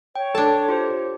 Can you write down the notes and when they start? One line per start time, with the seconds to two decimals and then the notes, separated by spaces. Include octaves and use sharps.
0.15 C#5 G5
0.35 D4 A4 A5
0.69 F4 G4 C5